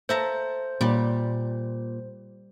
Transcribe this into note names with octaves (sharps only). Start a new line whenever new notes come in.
A4 C5 E5 A#5
A#2 G3 G4